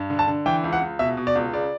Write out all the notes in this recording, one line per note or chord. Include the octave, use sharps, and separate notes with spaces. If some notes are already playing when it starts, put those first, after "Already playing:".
Already playing: G2
D3
A5
D3
E3 G5
C#2
F#5
C#2
B2 E5
B2
D5
C#2
C#3 D5